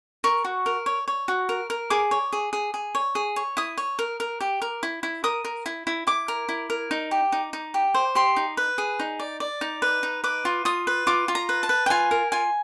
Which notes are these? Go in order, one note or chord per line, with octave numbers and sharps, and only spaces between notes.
A#4 C#6
F#4
A#4
C#5
C#5
F#4
A#4
A#4
G#4 D6
C#5
G#4
G#4
G#4
C#5
G#4
C#5
E4 D#6
C#5
A#4
A#4
G4
A#4
E4
E4
A#4 D#6
A#4
E4
E4
E4 D6
A#4
E4
A#4
D#4
G4
D#4
D#4
G4
C5
G4 C6
D#4
B4
G#4
D#4
D5
D5
D#4
B4
D#4
B4 D6
F4
F4 D#6
B4
F4 D6
F4
A#5
B4
A5
B4
G5
F4 G#5
A#4
F4 G#5